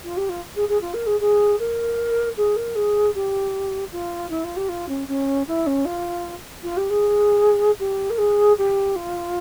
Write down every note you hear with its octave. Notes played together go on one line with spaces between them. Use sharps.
F4
G4
F4
G#4
G#4
F4
A#4
G#4
G#4
A#4
G#4
A#4
G#4
G4
F4
E4
F4
G4
F4
C#4
C#4
E4
C#4
F4
F4
G4
G#4
G4
A#4
G#4
G4
F4